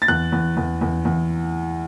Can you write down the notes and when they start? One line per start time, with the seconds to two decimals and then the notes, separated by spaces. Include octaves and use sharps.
0.02 A6
0.08 E2 F#6
0.32 E2
0.57 E2
0.81 E2
1.05 E2